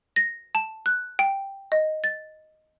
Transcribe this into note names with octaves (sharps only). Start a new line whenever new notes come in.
A#6
A5
F#6
G5
D#5
A6